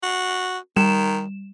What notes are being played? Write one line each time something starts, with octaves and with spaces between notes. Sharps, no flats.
F#4
D#3 G3 E7